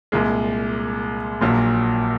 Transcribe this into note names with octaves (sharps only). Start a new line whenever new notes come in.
C2 A#2 G#3
A#1 A#2 F#3